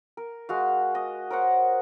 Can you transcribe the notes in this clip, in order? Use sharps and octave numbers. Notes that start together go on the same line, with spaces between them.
A#4
G#3 F#4 F5
D#5
A#4 C5 C#5 F#5